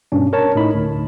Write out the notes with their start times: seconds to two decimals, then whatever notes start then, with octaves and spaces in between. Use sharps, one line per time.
0.12 G2 B2 C#4 D4
0.33 A#4 C#5 A5
0.55 A2 D#4 B5
0.75 D2